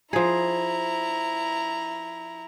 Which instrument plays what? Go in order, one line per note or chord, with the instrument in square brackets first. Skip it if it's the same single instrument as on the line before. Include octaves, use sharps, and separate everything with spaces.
[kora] F3 G#4 [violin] E4 A#5